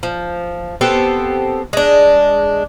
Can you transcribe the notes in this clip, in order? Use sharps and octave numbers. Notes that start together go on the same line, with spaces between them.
F3
B3 C4 G4 A4
G#3 D4